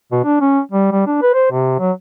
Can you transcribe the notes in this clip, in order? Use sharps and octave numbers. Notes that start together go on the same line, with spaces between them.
B2
D4
C#4
G3
G3
D4
B4
C5
C3
F#3